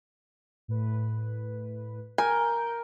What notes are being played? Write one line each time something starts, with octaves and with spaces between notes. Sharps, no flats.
A2 B4
A#4 G#5 G6